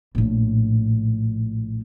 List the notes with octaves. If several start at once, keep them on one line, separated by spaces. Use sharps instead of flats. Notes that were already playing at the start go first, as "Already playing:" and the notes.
A#1 A2